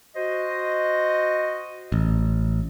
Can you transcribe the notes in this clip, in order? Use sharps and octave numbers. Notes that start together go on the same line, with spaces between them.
F#4 C5 D#5
A1